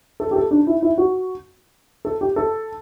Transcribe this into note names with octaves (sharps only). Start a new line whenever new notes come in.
A4
G4
A4
D4
E4
E4
F#4
A4
G4
A4